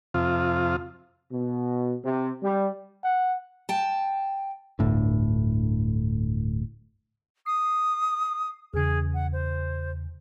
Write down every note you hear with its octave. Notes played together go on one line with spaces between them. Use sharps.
F2 C3 F4
B2
C3
G3
F#5
G5 A5
D1 G1 A2 D3
D#6 C7
E2 C#3 G#4
F#5
C5